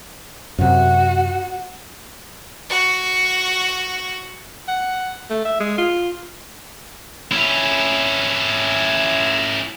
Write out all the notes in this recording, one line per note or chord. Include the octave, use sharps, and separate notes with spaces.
F#2 C3 F#4
F#4 C#6
F#5
A3
E5
G#3
F4
C#4 E4